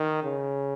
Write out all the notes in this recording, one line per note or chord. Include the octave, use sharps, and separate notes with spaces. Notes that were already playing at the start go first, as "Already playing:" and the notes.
Already playing: D#3
C#3